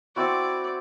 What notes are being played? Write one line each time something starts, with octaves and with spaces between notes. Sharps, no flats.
C4 E4 F#4 D5